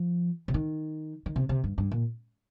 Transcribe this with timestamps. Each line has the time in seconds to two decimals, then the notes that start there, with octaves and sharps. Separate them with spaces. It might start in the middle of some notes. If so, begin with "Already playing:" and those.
Already playing: F3
0.48 C3
0.54 D#3
1.26 D#3
1.36 C3
1.49 C3
1.64 G2
1.78 G2
1.91 A#2